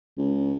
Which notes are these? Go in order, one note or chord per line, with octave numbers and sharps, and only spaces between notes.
C#2